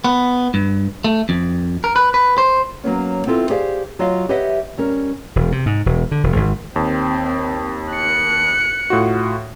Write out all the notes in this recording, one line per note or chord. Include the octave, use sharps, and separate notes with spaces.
B3
G2
A3
F2
A#4
B4
B4
C5
F#3 A#3 B3 C#4
B3 C4 E4 F4 A4
G4 G#4 C5 D5 F5
F#3 F4 F#4 D#5 F5
G4 B4 C#5 D#5 E5 F#5
G3 C#4 A#4
E1
C3
G#2
E1
D3
E1
G#1
D#2 C4
F#6 C#7
A2 F4 F#4